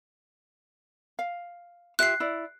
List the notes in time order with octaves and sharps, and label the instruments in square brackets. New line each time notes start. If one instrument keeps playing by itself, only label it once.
[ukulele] F5
[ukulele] F4 G4 E5 [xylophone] F#6 C7
[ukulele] E4 D5